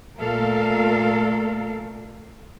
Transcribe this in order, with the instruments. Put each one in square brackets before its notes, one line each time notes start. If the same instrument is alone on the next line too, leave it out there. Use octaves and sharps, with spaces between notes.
[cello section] A#2 A3 A4 A#4 F5